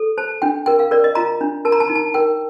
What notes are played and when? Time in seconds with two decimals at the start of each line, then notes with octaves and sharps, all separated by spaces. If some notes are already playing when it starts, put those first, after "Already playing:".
Already playing: A4
0.18 C5 A5
0.42 D4 G5
0.66 A#4 G5
0.79 F5
0.91 A#4 D5
1.04 D#5
1.15 F4 A#5
1.41 D4
1.65 A#4 A5
1.72 A#5
1.80 A5
1.88 D#4 A#5
1.95 A5
2.14 A#4 G5